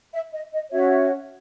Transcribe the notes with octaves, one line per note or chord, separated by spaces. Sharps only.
E5
D#5
D#5
C#4 F#4 C#5 E5